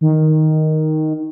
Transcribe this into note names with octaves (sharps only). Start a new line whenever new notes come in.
D#3